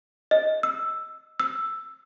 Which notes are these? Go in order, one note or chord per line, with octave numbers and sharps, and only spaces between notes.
D#5
E6
E6